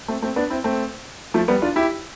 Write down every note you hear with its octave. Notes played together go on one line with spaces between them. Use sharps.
A3 C4
A3 C4
B3 D4
C4 E4
A3 C4
F3 A3
G3 B3
D4 F4
E4 G4